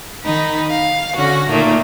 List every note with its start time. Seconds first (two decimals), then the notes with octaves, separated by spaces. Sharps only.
0.24 D#3 D#4 B5
0.70 F5
1.16 D3 C#4 F#4 A#6
1.50 A#2 D#3 A3 A#3